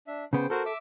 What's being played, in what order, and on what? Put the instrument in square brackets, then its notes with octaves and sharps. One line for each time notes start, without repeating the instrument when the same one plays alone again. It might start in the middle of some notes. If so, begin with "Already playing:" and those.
[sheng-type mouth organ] D4 E5
[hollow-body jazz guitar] C#3 B3 [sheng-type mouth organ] C5 G5
[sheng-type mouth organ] F#4 A#4 C5 [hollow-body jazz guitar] A4
[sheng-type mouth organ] E5 D6 E6